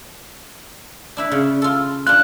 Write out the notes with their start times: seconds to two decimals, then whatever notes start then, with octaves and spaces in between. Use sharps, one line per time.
1.17 D4 E4 B4
1.31 C#3
1.62 F4 A4
2.07 D4 F4 F#6